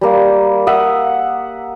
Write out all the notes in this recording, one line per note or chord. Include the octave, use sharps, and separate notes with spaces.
G3 A#3
E5 F#5 D#6